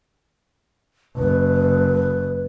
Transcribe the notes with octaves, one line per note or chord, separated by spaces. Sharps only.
F#1 B4